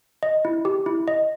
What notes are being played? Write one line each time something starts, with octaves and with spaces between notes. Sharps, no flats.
D#5
E4
G4
E4
D#5